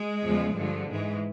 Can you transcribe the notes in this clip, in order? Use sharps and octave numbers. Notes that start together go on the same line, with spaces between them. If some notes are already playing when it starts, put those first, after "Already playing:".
Already playing: G#3
E2 C#3 F3
G2 D3 F3
G#2 E3 G#3